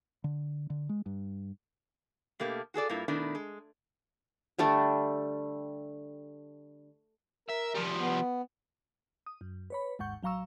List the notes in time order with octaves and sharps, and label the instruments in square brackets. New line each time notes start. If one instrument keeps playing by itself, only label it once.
[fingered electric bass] D3
D3
G#3
G2
[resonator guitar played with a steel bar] B2 A3 A#3 G4
F#4 G#4 A4 D5
G2 A#3 E4 F4
B2 D#3 A3 B3 D4 E4
G#3
[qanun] D3 G3 A3 D4
[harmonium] A#4 [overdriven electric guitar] E5
[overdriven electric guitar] F3 G3
[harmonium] B3
[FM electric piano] D#6
F#2
B4 C#5 B5
G#1 D#2 G#2 F#5 C#6 G6
A1 F#3 F5 A#5 C#6 E6